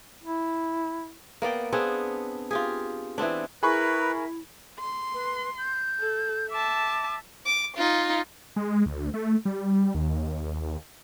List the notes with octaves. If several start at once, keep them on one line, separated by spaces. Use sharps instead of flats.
E4
A#3 B3 D5 G5
B3 C4 D4 G#4
F4 G4 G#4
E3 B3 C4 D4
E4 G#4 A#4 B4 E5 B5 C#6
C6
B4
G6
A4
E5 A5 D6
D6
D#4 F4
G#3
D2
A3
G3
D#2